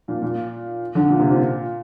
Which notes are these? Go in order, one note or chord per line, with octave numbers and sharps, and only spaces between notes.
A#2
A#2
D3
A#2
C3
A#2